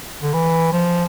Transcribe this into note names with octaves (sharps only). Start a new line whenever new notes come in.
D3
E3
F3